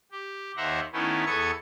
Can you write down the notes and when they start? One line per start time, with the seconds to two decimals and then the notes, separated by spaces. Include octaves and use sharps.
0.11 G4
0.57 D#2 C5 E5 F#5 A#5
0.93 D#3 A3 B3 C#4 D#4 E4
1.26 E2 B3 A4 C#6 D#6 G#6